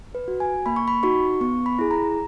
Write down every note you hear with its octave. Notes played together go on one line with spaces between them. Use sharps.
B4
F#4
G#5
A#3 B5
C#6
B5
D#4 F#4 C#6
B3 C#6
B5
E4 G#4
A#5